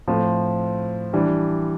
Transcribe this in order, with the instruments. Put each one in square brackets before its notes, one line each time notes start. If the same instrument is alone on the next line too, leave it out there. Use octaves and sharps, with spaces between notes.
[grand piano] A2 F3 C4
E3 G3 D4